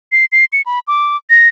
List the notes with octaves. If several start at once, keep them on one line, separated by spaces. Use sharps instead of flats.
C7
C7
C#7
B5
D6
A#6